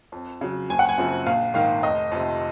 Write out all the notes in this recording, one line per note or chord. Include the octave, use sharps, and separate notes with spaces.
F2
C#3 F#3
F#1 G#5
F#5
G#5
F#2 C#3 F3 C4
A#1 F5
G#2 D#3 F5
F1 D#5
F2 C3